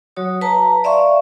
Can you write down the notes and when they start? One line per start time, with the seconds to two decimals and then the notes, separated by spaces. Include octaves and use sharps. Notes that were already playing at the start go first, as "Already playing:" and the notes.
0.16 F#3 F#4 C#5 D#6
0.41 B4 A5 A#5
0.84 D5 E5 F5 C6 C#6